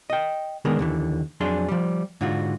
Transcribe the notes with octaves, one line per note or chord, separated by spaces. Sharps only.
D#5 G5
D#3 G#3 B3 D4 G#4 A#4
D#2 D3 E3
F2 F#3 D4 G#4 C6
F3 G3
G#2 D3 F4 F#4